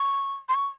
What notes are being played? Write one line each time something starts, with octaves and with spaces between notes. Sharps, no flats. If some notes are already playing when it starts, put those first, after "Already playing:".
Already playing: C#6
C6
C#6